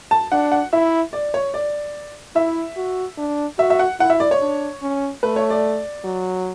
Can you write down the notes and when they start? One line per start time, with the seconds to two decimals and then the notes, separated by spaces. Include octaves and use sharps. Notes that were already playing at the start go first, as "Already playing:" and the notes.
0.11 A5
0.32 D4 F#5
0.52 F#5
0.73 E4 E5
1.13 D5
1.34 C#5
1.54 D5
2.36 E4 E5
2.77 F#4
3.18 D4
3.59 F#4 E5
3.70 E5
3.79 F#5
4.00 E4 F#5
4.10 E5
4.20 D5
4.31 C#5
4.41 D4
4.82 C#4
5.23 A3 B4
5.36 C#5
5.50 D5
6.04 F#3